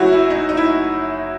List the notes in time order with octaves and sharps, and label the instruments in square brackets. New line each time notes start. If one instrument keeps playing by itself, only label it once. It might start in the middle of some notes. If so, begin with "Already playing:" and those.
Already playing: [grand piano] F#1 F#2 F#3 E4 F#4
E4
D#4
D#4
E4